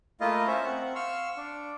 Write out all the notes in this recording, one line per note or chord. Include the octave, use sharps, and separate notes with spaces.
A3 A#3 E4 F4 D#5 F5
C#4 C5 C#5 E5
C4 F#5
F5 C6 C#6 E6 F6
D4